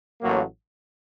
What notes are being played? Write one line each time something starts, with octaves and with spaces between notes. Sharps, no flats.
A1 A2 F#3 A#3